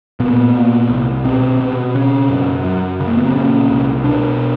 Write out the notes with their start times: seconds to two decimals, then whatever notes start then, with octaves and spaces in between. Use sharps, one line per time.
0.20 A#2 B3
0.55 A#2
0.89 C2
1.24 B2 C4
1.60 B2
1.95 C#3 C#4
2.29 F#2
2.65 F#2
3.00 C#3
3.07 A#3
3.16 B3
3.25 C4
3.35 A#2 C#4
3.70 C2
4.04 B2 D4